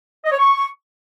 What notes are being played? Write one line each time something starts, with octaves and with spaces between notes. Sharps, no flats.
D#5
C#5
C#6